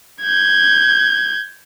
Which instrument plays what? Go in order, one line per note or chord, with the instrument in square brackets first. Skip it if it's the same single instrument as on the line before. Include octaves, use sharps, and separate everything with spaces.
[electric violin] G6 G#6